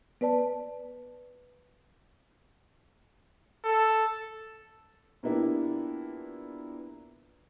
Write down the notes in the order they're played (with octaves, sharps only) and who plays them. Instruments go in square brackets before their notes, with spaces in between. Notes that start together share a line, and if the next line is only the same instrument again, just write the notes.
[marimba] B3 B4 D5 A5
[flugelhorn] A4
[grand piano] A#2 A#3 B3 D4 E4 G4